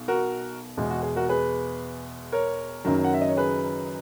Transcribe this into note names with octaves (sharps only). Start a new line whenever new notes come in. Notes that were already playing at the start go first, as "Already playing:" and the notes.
Already playing: B1 B2
F#4 A#4
E2 B2 G#3
F#4
G#4
F#4 A#4
G#4 B4
A#4 C#5
F#1 F#2 D#3 F#3
F#5
E5
D#5
C#5
G#4 B4